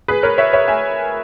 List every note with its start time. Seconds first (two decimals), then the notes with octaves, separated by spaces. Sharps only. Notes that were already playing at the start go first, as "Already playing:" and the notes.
0.08 G#4 B4
0.23 A#4 C#5
0.38 C#5 E5
0.53 C#5 E5
0.68 E5 G#5